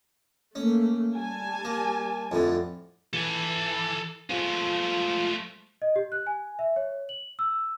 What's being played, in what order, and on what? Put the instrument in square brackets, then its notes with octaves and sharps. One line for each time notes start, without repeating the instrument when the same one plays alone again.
[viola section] A3 A#3 [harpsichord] C#4
[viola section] G3 G#5 A5
[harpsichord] A#3
F2 A2 D3
[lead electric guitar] E3 [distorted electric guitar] A4 G#5
[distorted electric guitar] G#3 A3 [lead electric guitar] F4 C5
[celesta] D#5
G4
F#6
G#5
E5
C#5
F#7
E6